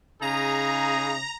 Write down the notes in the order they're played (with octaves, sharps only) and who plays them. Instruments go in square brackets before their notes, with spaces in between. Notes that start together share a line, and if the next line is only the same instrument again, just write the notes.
[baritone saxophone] C#3 [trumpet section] D#4 G#4 [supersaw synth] A#5